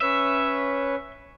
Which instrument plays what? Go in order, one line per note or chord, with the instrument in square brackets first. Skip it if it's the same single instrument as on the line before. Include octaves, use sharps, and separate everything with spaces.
[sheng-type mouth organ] C#4 B4 C#5 [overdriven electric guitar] E5